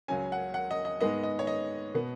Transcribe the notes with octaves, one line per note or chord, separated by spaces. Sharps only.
C#2 C#3 F#3 C#4 G#5
F#5
F#5
D#5
D#5
G#2 G#3 B3 D#5
D#5
C#5
D#5
B2 B3